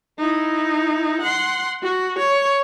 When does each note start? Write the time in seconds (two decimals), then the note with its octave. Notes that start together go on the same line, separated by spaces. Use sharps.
0.18 D#4 E4
1.21 F#5 C6
1.83 F#4
2.19 C#5